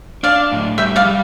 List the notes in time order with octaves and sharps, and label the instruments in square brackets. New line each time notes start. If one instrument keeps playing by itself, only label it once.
[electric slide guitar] D4 [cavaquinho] D5 F5
[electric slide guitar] A2
[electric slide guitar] G3 [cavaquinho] E5 G5
[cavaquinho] D5 F5
[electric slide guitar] G3